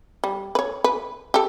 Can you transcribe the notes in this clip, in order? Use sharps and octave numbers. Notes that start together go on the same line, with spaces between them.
G3
B4 C#5
B4
G4 A4